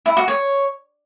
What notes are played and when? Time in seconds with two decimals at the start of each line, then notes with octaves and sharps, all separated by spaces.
0.06 E4
0.17 F#4
0.28 C#5